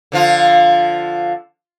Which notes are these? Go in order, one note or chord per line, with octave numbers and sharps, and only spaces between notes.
D3 F3 F4